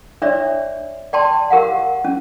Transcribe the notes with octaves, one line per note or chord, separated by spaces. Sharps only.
D4 C#5 D5 E5
D5 G5 A5 C6
G4 A#4 F5 F#5
C#4